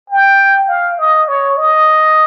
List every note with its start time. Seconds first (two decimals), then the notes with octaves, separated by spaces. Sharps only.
0.10 G5
0.69 F5
0.99 D#5
1.28 C#5
1.57 D#5